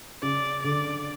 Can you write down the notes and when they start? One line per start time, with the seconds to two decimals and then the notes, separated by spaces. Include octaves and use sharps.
0.22 C#3 D5
0.63 D3 D5